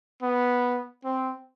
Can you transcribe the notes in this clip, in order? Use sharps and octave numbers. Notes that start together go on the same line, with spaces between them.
B3
C4